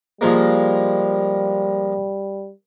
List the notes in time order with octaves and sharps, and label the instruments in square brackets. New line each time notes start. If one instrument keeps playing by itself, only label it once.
[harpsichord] F3 G#3 A#3 [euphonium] G3